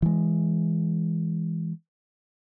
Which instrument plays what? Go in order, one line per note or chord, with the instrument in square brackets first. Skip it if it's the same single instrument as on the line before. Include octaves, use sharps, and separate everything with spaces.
[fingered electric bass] E3 G#3